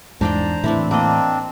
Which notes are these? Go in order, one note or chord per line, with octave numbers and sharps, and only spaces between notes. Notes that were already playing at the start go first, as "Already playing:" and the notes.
E2 G#2 D4 C5 D5 G5 A#5
A2 E3 C4 D4 E4
A#3 C4 D4 D#5